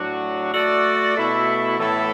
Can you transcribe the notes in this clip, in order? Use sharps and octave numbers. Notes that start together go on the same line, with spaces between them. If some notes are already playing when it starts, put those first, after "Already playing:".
Already playing: A2 F#3 D4 F#4
A3 F#4 A4 D5
B2 A3 E4
A2 E3 B3 E4 A4